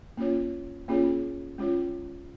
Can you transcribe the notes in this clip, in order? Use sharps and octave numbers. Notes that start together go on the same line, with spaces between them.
A#3 C#4 F4 C#5
A#3 C#4 F4 G#4 C#5
G#3 C#4 F4 C#5